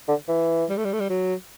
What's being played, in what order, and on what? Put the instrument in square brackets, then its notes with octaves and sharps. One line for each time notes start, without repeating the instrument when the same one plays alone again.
[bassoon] D3
E3
[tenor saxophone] G3
A3
G3
A3
G3
F#3